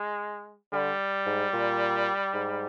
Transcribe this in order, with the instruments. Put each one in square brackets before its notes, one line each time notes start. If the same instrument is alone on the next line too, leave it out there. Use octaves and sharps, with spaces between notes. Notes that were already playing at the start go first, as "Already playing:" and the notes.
Already playing: [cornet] G#3
[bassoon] D3 [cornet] G3
[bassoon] G#2
A#2
G#2